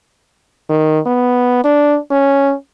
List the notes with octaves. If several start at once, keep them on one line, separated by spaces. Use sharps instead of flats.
D#3
B3
D4
C#4